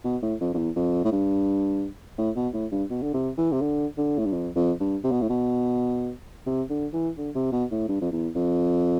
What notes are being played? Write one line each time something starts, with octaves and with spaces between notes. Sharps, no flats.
B2
A2
F2
F2
E2
F2
A2
G2
A2
B2
A2
G2
B2
D3
C3
E3
C3
D3
D3
A2
G2
F2
F2
G2
C3
B2
A2
B2
C3
D3
E3
D3
C3
B2
A2
G2
F2
E2
F2